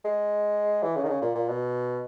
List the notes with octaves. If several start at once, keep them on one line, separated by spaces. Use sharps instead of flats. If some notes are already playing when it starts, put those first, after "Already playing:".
G#3
E3
C#3
D#3
C#3
A#2
A#2
B2